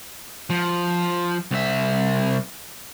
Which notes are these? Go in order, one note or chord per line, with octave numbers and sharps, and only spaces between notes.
F3
C2 E5